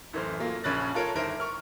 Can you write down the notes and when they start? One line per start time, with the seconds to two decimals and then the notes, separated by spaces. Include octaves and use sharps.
0.13 A1 F#2 E3 A3 C5 F6
0.40 F#3 A3 A#3 F4
0.64 A#1 C#3 C#4 B5 F#6 A6
0.95 F4 A4 A#4 C#5
1.15 G1 D#2 E4 A#4 C5 E5
1.40 C#6 F6